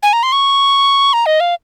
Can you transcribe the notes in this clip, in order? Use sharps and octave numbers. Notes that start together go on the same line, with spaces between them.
G#5
A#5
C6
C#6
A#5
D#5
F5